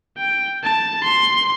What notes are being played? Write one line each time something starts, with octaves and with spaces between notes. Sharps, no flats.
G5
A5
C6